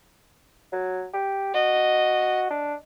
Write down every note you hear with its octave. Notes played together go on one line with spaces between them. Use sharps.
F#3
G4
F#4 D#5
D4